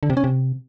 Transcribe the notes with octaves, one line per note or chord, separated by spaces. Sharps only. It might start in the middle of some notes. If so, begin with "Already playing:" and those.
D3
C3
C#4
C3